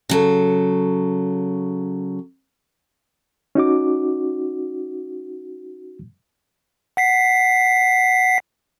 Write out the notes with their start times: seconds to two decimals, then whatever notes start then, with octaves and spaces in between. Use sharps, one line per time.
0.09 C#3 F#3 A4
3.55 C#4 D#4 F#4 D6
6.97 F#5 B6 C7